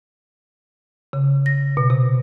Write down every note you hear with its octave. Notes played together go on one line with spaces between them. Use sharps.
C#3
A#6
B2
C3